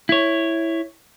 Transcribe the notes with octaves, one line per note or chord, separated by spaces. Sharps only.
E4 C#5